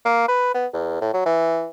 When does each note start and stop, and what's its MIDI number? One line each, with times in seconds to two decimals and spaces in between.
0.05 0.25 58
0.28 0.53 71
0.54 0.67 59
0.73 0.97 40
1.01 1.10 45
1.14 1.22 54
1.26 1.68 52